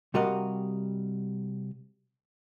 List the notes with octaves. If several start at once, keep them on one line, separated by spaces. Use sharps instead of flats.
C3 G3 F#4 A#4 D#5 F5